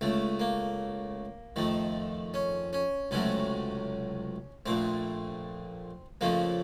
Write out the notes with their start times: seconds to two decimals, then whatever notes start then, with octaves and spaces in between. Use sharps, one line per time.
0.01 C#2 C#3 A3
0.40 A#3
1.56 F2 D#3 A3
2.34 C#4
2.73 C#4
3.11 C#2 C3 F#3 A3 C#4
4.66 A#1 A#2 A3 C4
6.21 F2 C#3 F3 A3 A#3